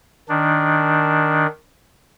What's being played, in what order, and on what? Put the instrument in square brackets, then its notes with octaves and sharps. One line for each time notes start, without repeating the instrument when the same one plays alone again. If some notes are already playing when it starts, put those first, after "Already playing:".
[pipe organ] D#3 D4